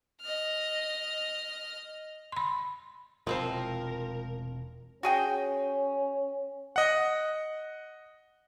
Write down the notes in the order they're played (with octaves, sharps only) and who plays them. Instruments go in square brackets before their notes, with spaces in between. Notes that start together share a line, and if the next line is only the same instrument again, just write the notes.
[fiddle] D#5 F6
[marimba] B5 C6
[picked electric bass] E1 C3 G#3 [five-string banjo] F3 C4 C5 [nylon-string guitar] F4 [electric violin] A#4
[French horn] C#4 [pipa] F#4 G#4 G5
[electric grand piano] D#5 F#5